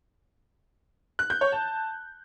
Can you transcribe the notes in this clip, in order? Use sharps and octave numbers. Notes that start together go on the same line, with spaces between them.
F#6
G6
C#5
A5